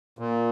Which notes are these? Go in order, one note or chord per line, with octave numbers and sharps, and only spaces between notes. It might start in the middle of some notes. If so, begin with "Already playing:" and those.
A#2